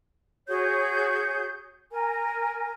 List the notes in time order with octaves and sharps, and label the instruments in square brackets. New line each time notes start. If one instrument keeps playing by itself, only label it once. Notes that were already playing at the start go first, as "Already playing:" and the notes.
[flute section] F#4 G#4 C#5 G6
A#4 G#5